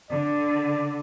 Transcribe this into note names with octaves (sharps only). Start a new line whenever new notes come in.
D3 D5